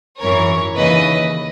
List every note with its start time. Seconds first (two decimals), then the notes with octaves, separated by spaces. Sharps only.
0.21 G#1 F#2 E3 A#4 C#5
0.76 D#2 C#3 E3 B4 D#5